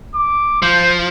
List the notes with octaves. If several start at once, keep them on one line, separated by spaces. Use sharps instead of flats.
D6
F3 C5